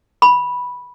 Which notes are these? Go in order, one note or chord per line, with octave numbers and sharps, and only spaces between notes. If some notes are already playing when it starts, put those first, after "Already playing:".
B5